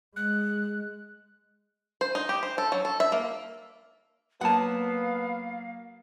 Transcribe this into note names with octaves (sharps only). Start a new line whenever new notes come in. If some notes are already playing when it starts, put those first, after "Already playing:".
G#3 F#6
C5
D#4
G4
C5
A4
F#3
A4
E5
A#3
F#3 A#3 B3 F5 F#5 A5